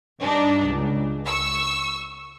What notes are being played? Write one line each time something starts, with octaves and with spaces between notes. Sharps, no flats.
G2 D4 D#4
C#2
C#6 E6